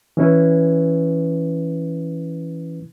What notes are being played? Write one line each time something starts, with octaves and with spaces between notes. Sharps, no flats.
E3 C#4 E4 B4